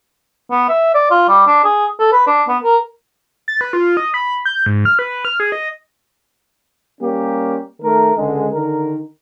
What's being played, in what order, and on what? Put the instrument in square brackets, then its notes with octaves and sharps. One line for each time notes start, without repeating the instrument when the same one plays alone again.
[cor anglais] B3
E5
D5
F4
G3
D4
G#4
A4
B4
D4
B3
A#4
[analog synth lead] A6
B4
F4
D#5
B5
G6
G#2
F6
B4
F6
G#4
D#5
[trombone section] G3 A#3 C#4 G4
D#3 A3 A#4
C#2 D3 G#3
D3 D#3 A#4